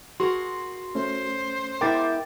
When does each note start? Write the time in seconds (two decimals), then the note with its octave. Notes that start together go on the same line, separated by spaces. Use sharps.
0.20 F#4 G#4 A#4 C6
0.95 A3 C#4 C5
1.81 G#3 B3 E4 A#4 G5 D6 A6